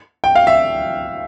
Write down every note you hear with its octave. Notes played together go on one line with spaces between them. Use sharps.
G5
F5
E5